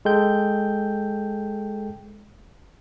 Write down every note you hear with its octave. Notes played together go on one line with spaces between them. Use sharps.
G#3 A4 G5 G6